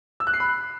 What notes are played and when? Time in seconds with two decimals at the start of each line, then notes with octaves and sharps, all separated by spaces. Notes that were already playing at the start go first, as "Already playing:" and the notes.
0.20 E6
0.27 F#6
0.34 C7
0.40 B5